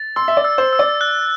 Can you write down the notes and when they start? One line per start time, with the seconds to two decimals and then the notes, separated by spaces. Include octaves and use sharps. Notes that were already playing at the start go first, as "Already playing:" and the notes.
Already playing: A6
0.16 C6 E6
0.28 E5
0.37 D5
0.45 E6
0.58 C5
0.73 E6
0.79 D5
1.01 F#6